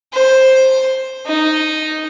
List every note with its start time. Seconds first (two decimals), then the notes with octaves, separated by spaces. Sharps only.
0.13 C5
1.27 D#4